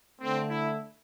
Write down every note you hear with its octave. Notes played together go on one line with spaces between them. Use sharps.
D3 A3 C4
E4